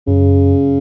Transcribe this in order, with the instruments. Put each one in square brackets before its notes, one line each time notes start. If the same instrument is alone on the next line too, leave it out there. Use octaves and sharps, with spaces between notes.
[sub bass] F#2 [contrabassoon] C#3